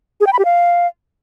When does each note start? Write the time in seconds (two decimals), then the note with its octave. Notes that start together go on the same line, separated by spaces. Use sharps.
0.20 G#4
0.27 G5
0.33 B5
0.39 G4
0.45 F5